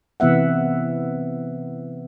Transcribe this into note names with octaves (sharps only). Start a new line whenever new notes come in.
C3 E3 B3 E5 F#5